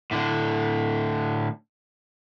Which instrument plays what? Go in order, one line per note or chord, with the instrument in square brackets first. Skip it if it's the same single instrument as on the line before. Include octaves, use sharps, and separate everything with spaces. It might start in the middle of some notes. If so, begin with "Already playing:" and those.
[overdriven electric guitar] A2 D3